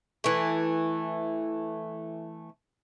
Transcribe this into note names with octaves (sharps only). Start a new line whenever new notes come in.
E3 A3